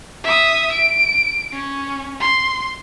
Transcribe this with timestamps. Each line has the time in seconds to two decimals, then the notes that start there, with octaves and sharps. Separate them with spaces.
0.24 E5 D#6
0.73 D7
1.53 C#4
2.20 C6